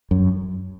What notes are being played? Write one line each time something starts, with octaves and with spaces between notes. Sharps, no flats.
F#2